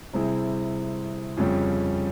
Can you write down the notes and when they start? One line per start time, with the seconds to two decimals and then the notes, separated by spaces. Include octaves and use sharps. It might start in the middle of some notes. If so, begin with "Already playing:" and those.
0.13 C3 G3 C4 E4 G#4
1.37 F2 C#3 G3 C#4